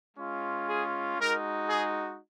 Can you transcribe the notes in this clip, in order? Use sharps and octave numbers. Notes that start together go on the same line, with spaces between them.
G#3 C#4 F4
G#4
G#3 D#4 F#4 A#4
G#4